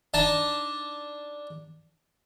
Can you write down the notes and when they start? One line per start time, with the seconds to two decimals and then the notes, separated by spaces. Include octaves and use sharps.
0.14 D4 D#4 A5